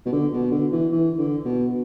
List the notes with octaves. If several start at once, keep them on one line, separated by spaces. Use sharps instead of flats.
B2
D3
B2
D3
E3
E3
D3
B2